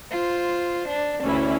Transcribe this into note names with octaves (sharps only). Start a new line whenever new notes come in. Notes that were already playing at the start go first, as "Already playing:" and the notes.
F4 C5
D4
D2 E3 C#4 E4